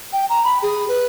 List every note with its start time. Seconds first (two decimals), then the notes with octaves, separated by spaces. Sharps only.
0.13 G5
0.29 A#5
0.44 B5
0.62 G#4
0.88 B4